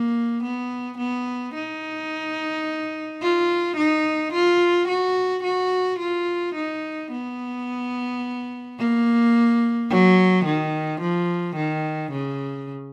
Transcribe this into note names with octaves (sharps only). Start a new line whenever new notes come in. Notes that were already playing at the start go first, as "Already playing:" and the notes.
Already playing: A#3
B3
B3
D#4
F4
D#4
F4
F#4
F#4
F4
D#4
B3
A#3
F#3
D#3
F3
D#3
C#3